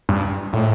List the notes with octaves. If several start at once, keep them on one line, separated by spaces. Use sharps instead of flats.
G2
A2